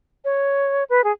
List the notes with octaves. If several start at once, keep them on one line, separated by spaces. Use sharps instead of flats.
C#5
B4
G#4